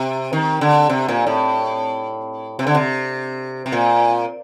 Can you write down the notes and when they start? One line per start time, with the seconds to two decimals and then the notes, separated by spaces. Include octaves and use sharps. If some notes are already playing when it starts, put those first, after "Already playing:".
Already playing: C3
0.33 D#3
0.61 D3
0.89 C3
1.08 A#2
1.27 A2
2.59 C3
2.67 D3
2.75 C3
3.66 C3
3.72 A#2